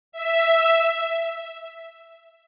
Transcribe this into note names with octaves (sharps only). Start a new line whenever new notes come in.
E5